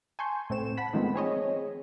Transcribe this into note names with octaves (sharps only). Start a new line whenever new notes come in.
G#5 A5 C6 C#6 G6
A2 A3 C4 E7
F#5 A5 B5 B6
D#3 F3 G#3 A3 B3 C4
C4 G#4 C#5 D#5